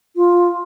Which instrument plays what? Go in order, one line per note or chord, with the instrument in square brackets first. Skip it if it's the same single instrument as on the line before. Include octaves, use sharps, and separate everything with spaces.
[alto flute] F4